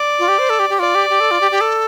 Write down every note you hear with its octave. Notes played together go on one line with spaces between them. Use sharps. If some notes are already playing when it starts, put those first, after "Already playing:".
Already playing: D5
F4
G4
C5
A4
G4
G4
F4 D5
G4
G4
A4
F4
G4
G4
A4